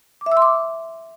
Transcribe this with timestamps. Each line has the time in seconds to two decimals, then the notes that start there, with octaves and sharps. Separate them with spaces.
0.21 D6
0.26 E5
0.32 E6
0.37 C6
0.42 D6